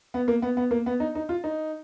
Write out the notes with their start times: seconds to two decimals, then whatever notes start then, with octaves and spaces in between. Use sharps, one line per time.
0.14 B3
0.28 A#3
0.42 B3
0.57 B3
0.71 A#3
0.86 B3
1.00 D#4
1.15 D#4
1.29 F4
1.44 D#4